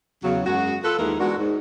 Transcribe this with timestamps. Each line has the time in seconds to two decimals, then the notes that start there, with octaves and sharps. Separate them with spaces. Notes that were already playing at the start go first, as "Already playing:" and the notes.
0.24 E2 C#3 F#3
0.45 F#2 G#3 F#4
0.84 F4 A4 B4
0.98 D#2 D#3 E3 G#3 A#3 A#4
1.20 G#3 B3 D4 F#4
1.38 G#2